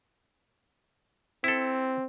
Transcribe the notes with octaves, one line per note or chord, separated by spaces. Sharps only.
C4 E4 A4